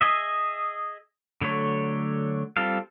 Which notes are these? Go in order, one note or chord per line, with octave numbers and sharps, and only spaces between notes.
G#4 D#5 E5
D3 F#3 A3 C#5
G3 C4 F4 A4 F5